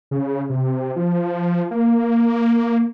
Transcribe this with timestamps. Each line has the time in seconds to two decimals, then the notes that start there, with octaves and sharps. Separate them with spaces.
0.11 C#3
0.50 C3
0.96 F3
1.71 A#3